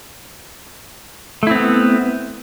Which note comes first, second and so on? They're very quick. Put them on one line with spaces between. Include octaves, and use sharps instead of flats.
A3 E4 C4 B3